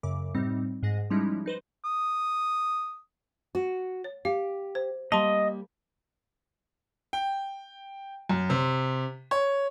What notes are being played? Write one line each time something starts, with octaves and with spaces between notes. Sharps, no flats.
F#2 C#3 D6
A2 G3 C4 D#4
G#2 G#4 F#5 A#6
F3 G3 G#3 C#4 D#4 E4
D#4 B4 C5
D#6
F#4
C#5
G4 F5
C5
G3 A#3 D#5 A5 C6
G5
F#2
C3
C#5